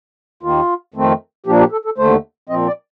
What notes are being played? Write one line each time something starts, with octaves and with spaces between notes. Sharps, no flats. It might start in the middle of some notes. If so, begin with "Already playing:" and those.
D#2 D#3 A#3 F4
F2 D#3 A3 C4
A#2 F3 A#3 D4 G4
G4
A4
A4
D#2 D3 A3 C5
A#2 F3 C4 D#5
D5